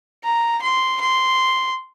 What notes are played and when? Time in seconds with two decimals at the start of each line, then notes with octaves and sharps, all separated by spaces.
0.24 A#5
0.62 C6
1.01 C6